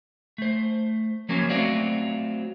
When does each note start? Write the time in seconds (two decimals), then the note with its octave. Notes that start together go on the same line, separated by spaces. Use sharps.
0.38 A3 C5
1.29 F3 F#3 A#3 C#4
1.50 F#3 A3 C4 F4 F#4 D5